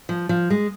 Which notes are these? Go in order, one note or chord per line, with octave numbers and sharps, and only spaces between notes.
F3
F3
G#3